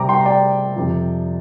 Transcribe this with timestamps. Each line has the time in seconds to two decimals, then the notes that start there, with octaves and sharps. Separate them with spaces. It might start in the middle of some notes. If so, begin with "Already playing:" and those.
Already playing: C3 G3 C4 A#5 D6
0.09 G5 C6
0.20 A#5
0.26 D5 G5
0.75 F2 C3 F3